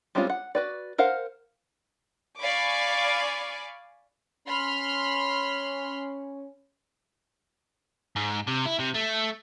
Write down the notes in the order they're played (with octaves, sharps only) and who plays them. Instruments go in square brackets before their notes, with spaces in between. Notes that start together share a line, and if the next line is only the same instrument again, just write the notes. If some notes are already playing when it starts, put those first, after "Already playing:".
[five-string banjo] G3 G#3 C4 C#4 F4
F#5
F#4 B4 D5
A#4 C5 F5 F#5
[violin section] D5 F5 G#5 B5 C#6 D6
[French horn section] C#4 [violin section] B5 C6 F6
[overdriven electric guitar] G#2
C3
E4
C3
A3